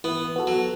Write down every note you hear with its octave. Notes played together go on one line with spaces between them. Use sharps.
E3 B3
B3 F#4 A4
F#3